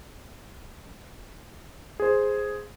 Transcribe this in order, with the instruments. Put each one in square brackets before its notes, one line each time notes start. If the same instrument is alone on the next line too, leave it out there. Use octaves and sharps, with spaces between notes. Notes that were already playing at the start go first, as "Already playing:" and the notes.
[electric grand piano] G#4 C5